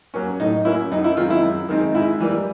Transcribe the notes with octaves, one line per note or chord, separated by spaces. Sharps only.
F#3 A#3 C#4
A2 D#4
F#3 A#3 C#4 E4
F#2 D#4
E4
D#3 G#3 C4 D#4 F4
E4
F#2
D#3 G#3 C4 D#4
G#2 E4
E3 G3 A#3